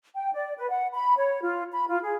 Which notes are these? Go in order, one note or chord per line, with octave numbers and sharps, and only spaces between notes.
G5
D5
B4
F#5
B5
C#5
F4
B5
F4
G#4